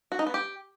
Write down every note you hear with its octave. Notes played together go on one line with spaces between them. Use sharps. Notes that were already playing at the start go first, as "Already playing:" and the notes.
F#4
D#4
B3
G4